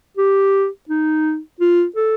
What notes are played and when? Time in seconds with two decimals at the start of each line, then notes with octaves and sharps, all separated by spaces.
0.17 G4
0.89 D#4
1.60 F4
1.96 A4